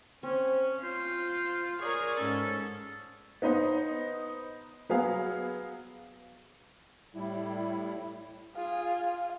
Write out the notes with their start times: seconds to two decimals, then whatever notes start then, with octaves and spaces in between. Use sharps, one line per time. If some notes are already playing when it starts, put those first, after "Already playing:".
0.23 C4 C#4
0.83 F4 C5
1.80 G#4 A#4 C#5 D5
2.16 G#2 C#4 A4
3.42 B3 D#4 C5 D#5
4.89 F#3 B3 G#4 F5
7.15 A2 G3 E4
8.55 F4 G#4 F5